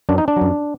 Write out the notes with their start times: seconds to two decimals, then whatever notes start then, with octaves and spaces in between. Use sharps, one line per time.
0.09 F#2 F#3 D4
0.18 D#4
0.28 D4
0.36 F#2 F#3